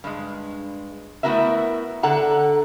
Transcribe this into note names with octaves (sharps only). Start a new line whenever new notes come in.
G2 G#3
A3 B3 E4 F#4 A#4 E5
D3 A4 F#5 A#5